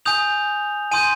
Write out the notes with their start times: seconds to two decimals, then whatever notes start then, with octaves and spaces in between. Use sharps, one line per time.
0.05 G#5 D#6 G6 F7
0.92 G#5 C6 D#6 G6 D#7